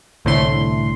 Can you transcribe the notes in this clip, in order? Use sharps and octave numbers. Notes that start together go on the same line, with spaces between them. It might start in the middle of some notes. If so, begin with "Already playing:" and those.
C2 A2 D3 A3 C6